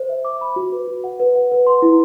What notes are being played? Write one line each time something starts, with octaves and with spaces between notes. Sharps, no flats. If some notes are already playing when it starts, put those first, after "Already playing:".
Already playing: C5
E5
D6
B5
F#4
B4
F#4
F#5
B4
F#5
B4
C6
E4